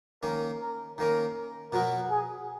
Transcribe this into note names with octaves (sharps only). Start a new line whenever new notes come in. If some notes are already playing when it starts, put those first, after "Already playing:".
D#3 A#3 C#4 A#4
A#4
D#3 A#3 C#4 A#4
B2 F#3 B3 F#4 A#4
G#4